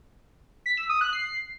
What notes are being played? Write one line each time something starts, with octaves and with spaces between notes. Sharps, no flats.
B6
E6
D#6
F#6
C7